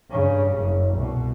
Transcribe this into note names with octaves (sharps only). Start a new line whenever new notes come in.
G2 C#3
F#1
C2 B2